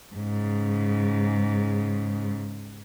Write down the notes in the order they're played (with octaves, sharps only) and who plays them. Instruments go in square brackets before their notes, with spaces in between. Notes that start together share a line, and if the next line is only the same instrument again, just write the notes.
[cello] G#2 C#3